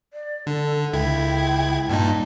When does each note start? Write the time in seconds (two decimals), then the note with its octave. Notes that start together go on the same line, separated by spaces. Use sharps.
0.14 D5
0.47 D3 A4
0.93 C#2 E4 G5 G#6
1.89 G2 A#2 D#4 A5